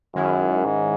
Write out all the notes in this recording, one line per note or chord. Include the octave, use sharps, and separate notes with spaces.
F#2 D#3 G#3 C#4 E4
G#2